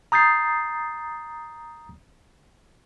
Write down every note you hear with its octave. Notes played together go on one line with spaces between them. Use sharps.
A#5 D#6 G6 A6 C7